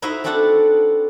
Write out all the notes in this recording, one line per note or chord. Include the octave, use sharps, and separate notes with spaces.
D#4 E4 F#4 C5 D#5 E5
C4 D4 F#4 A4 F#5 A5